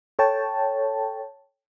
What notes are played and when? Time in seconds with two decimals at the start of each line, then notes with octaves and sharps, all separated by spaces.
0.19 A4 C#5 G5 A5